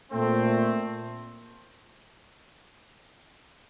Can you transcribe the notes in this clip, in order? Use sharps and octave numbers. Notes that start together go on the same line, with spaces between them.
A#2 A3 C4